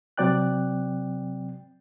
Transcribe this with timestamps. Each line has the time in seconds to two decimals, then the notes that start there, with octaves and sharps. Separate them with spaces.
0.18 C3 F#3 C4 D5 G5 F#6